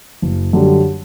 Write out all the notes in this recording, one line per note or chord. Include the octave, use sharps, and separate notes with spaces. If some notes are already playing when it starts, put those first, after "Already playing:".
F#1
F#2 D3 G3